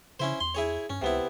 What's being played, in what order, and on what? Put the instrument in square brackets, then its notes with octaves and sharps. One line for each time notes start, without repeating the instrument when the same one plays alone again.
[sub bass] C#3 [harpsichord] C#4 E4 C5
[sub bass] E2 [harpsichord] C6
[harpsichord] E4 G#4 C#5
[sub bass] G2 [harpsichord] C#4
[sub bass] C#2 [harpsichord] C3 B3 E4